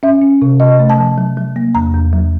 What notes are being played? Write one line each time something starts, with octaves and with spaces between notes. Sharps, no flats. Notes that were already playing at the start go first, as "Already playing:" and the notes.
C#4 E5
C#4
C3
C3 D#5
A3
A5
F3
F#3
F#3
A#3
E2 A#5
E2
F#3